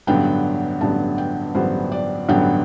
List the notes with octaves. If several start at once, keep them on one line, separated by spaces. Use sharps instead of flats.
A1 G2 D3 F#3 B3 G5
A1 G2 D3 F#3 B3 A5
G5
A1 G2 D3 F#3 B3 C5
D5
A1 G2 D3 F#3 B3 G5